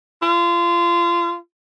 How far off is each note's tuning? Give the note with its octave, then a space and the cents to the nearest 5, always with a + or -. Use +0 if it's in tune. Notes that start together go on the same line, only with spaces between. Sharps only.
F4 -25